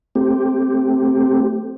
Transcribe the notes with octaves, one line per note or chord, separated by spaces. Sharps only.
A3 C4 G4